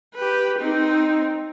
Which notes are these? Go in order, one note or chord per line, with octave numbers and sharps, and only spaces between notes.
G4 B4
C4 D#4